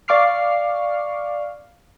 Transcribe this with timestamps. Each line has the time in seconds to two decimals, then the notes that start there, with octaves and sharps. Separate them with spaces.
0.08 D5 F5 C#6 D6 F6 C7